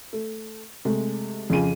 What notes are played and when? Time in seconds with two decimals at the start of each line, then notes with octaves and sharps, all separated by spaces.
0.13 A3
0.85 C3 G#3 A3
1.50 F2 C#3 F3 F4 G#4 D#7